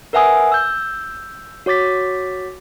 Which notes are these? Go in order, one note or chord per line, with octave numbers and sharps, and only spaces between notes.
A#4 B4 E5 F#5 G#5 D#6
E6 G6
F#4 C#5 D6 A6 B6